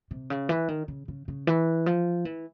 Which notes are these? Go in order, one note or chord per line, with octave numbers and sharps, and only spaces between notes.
C3
C#3
E3
D#3
C#3
C#3
C#3
E3
F3
E3